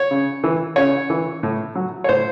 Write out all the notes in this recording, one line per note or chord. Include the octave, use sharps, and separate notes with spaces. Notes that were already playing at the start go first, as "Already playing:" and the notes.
Already playing: C#5
C#3
E3
C#3 C#5
E3
A2
F#3
C#5
A2 C5